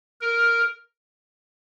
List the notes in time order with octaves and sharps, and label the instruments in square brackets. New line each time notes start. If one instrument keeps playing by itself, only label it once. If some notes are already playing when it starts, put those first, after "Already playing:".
[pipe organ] A#4